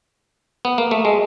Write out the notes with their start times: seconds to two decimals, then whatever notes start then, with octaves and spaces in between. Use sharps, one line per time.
0.65 B3
0.78 A#3
0.91 A3
1.05 G#3